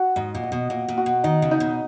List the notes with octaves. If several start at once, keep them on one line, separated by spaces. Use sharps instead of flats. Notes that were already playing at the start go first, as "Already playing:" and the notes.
Already playing: F#4
G#2 D#5
A#2
D#5
B2
A#2 D#5
A#2
F#4
B2
D#3 D#4
C#3
D#4
B2